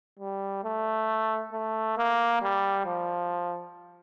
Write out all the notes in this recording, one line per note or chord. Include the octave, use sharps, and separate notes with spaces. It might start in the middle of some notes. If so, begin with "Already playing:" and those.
G3
A3
A3
A#3
G3
F3